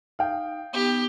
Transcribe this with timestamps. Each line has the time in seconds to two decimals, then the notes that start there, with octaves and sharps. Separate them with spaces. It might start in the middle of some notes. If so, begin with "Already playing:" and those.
0.19 D#4 F5 G5
0.73 B3 D#4 G4